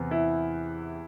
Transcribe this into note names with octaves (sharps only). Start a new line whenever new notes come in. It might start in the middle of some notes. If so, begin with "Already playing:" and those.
Already playing: E2 C3 B3
E4